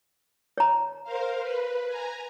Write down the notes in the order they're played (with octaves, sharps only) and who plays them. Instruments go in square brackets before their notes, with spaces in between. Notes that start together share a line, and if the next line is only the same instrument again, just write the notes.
[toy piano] C#5 A#5
[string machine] A#4 C5 F5
B4
G#5 A#5